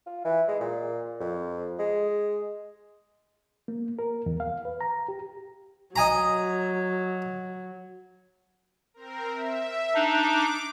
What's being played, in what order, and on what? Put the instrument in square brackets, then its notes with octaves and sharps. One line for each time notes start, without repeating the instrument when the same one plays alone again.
[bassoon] F4
E3
G#3
A#2
F2
G#3
[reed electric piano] A#3
A#4
E2
F5
B4
A#5
G4
[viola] F#3 [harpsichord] D#5 G#5 A#5
[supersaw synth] C4 A#4
E5
[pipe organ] D4 D#4 [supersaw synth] D6